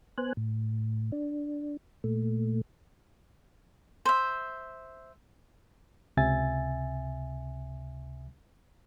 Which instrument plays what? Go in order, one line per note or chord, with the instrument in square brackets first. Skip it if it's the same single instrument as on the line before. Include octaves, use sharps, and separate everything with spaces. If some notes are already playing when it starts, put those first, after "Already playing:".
[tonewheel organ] B3 C5 G#5 F#6
A2
D4
A#2 A3
[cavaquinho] C5 E5
[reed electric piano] C#2 C3 E5 G#5 A6